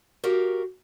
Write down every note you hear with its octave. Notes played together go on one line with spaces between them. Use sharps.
F#4 G4 A#4 F5